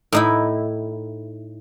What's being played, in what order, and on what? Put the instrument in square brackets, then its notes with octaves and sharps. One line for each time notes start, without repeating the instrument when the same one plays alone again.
[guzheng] A2 D#4 E4